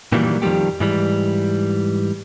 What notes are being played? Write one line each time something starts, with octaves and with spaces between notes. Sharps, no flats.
A#2 D#3 E3 F#3 G3 A#3
F2 D#3 F3 G3 A3 G4
G#2 E3 G3